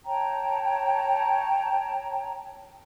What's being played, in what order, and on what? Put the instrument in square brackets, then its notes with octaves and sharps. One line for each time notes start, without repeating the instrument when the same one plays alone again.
[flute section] C#5 G5 A5 A#5